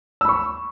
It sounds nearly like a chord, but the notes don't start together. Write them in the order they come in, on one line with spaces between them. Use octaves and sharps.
E6 B5 C#6